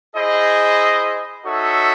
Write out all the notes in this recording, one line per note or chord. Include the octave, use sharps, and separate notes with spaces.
E4 G#4 C5 D#5
D#4 F#4 A4 C#5 E5